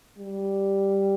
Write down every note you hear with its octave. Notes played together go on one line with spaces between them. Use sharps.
G3